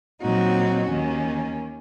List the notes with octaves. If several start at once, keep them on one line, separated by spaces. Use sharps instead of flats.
A#2 F#3 C4 D#4 F#4
D#2 D#3 A#3 C#4